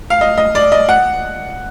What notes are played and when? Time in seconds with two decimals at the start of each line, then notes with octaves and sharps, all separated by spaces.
0.10 F5
0.21 D#5
0.37 D#5
0.55 D5
0.72 D#5
0.89 F#5